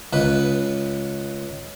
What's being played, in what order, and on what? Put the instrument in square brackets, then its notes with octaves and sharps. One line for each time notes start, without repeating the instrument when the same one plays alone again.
[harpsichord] C#2 B4